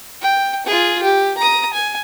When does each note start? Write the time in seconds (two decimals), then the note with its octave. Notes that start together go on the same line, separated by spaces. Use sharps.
0.21 G5
0.66 F4 G#4
1.02 G4
1.37 A#5 D#6
1.73 G#5